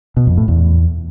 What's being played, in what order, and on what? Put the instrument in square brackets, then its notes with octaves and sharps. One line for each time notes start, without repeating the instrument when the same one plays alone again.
[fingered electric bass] B2
F2
A2
E2